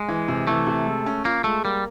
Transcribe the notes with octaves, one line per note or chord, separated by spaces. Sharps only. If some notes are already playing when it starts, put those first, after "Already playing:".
Already playing: G#3
E3
C3
E3 A3
C3
G#3
C#4
A#3 F4
G#3 A3
G3 A#3